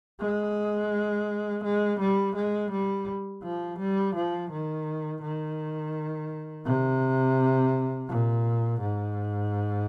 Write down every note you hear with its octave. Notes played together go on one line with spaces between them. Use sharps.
G#3
G#3
G3
G#3
G3
F3
G3
F3
D#3
D#3
C3
A#2
G#2